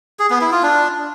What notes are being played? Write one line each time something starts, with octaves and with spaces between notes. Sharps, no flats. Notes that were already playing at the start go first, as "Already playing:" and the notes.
G#4
B3
E4
F4
D4